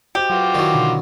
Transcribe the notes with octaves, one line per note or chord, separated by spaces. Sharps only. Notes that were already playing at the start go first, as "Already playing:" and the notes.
F#4 G4 C5 D#5
F#3 F4 F#4 B4 D6
D#3 F#3 E4 D5
B2 D3 D#4